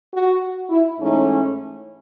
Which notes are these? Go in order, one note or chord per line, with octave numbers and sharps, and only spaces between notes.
F#4
E4
G#2 E3 A3 C#4 D#4